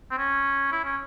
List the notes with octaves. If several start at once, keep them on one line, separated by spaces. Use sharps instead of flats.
C4
C#4
E4
C#4